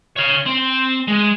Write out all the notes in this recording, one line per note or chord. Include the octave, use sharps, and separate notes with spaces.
C#5 F5
C4
G#3